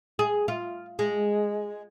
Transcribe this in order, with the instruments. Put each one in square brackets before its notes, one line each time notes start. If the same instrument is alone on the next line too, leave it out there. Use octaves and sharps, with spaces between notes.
[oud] G#4
F4
G#3